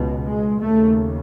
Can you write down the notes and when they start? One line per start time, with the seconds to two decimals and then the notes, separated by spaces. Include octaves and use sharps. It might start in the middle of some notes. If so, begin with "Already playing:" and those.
Already playing: C#2 B2
0.26 G#3
0.62 D#2 C#3 A3